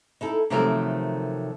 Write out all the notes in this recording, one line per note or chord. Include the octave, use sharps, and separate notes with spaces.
D#4 E4 A4
C3 D#3 F3 F#3 A3 A#4